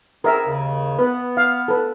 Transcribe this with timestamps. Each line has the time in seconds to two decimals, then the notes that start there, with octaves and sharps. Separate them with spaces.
0.24 B3 C4 G#4 A#4 E5
0.47 D#2 C#3
0.99 B3 B4
1.37 F5
1.68 A4 B4